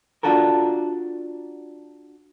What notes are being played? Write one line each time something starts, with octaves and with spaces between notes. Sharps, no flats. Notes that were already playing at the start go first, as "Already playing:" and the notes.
D4 F4 F#4 A4 A#4